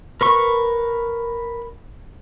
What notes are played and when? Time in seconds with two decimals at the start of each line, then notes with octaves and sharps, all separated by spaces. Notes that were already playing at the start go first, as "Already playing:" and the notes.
0.21 A#4 B4 C#6